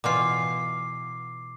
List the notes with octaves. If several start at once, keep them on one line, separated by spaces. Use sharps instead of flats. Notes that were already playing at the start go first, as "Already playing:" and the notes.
B2 E3 F4 D6 C7